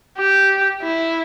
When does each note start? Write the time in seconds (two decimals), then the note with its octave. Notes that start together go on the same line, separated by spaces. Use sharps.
0.18 G4
0.82 E4